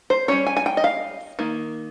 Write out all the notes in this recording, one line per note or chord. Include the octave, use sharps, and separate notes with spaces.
C5
G3 C#4 C#5
G#5
G#5
G5
D#5
F5
D#3 A#3